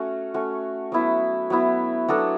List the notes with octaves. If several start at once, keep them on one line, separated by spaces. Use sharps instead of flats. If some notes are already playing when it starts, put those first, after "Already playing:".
Already playing: A3 C#4 F#4
A3 C#4 F#4
F#3 B3 E4
F#3 B3 E4
F#3 B3 D4 A4